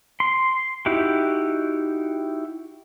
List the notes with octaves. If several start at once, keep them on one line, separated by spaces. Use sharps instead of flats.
C6
D#4 E4 F#4 G4